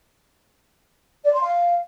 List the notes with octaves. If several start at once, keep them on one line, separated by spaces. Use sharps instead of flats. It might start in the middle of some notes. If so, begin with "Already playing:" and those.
D5
C6
F5